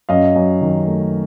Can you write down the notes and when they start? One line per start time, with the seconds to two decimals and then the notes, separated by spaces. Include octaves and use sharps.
0.09 F#2 D#5 F5
0.36 F#2
0.61 D#3
0.87 A3